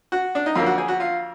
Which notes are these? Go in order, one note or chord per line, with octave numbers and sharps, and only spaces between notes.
F#4
D4
D#4
F2 D3 F#3 A#3 F4
F#4
G#4
F#4
F4